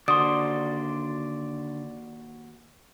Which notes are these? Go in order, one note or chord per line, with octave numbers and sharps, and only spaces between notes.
D#2 D3 F#4 D5 C6 D#6